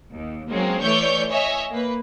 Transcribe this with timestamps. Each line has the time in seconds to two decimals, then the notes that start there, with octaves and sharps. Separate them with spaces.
0.12 D#2
0.50 F#3 G#3 A#3 C4 C#4
0.82 E3 A3 C#5 D5 C#6 G6
1.30 C#5 D#5 E5 G#5
1.71 A#3 B4